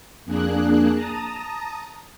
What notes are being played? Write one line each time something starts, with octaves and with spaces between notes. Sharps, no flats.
F2 A#3 D4 G#4 F#6
A5 A#5 D#6